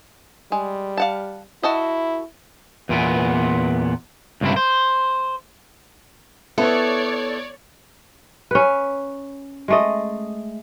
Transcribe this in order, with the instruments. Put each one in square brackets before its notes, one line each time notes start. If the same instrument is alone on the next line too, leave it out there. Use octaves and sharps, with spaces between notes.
[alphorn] G3 [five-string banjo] G#3
[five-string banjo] F5 F#5 A5
[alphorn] E4 [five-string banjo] F#4 A4 D#5
[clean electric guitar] E2 A#2 B3
C#2 G2 C3 E4
C5
[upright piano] B3 E4 [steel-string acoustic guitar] A4 [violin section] C#5 D5
[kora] C#4 B4
G#3 A3 D#5